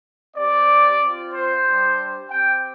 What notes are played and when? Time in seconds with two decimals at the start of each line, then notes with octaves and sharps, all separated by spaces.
0.37 C4 G4 D5
1.02 C4 F4
1.34 C5
1.66 G3 D4 G4
2.31 C4 G4 G5